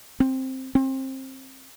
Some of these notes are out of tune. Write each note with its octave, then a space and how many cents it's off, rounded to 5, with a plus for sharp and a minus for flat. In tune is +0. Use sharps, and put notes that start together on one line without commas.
C4 +5
C4 +25